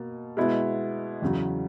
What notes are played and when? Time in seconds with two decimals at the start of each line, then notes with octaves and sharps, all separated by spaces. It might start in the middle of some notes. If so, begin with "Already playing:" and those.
Already playing: B2 A#3
0.37 B2 G#3 B3 E4
1.22 E2 C#3 F#3